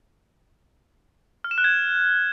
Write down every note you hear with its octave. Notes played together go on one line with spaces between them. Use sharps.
F6
E7
F#6
G#6